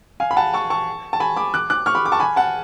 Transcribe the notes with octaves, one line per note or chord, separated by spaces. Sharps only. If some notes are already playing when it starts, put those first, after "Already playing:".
F5 G#5
B5
F#5 A5
A5 C#6
A5 C#6
A5
G#5 B5
B5 D6
D6 F#6
D6 F#6
C#6 F6
B5 D6
D6
A5 C#6
G#5 B5
F#5 A5